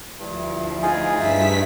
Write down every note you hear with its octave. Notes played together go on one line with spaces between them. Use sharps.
D2 G2 F3 E4
D#4 F4 G#4 G#5
G2 E5 B6